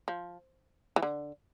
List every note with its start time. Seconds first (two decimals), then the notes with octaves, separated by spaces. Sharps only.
0.08 F3
0.96 E3
1.02 D3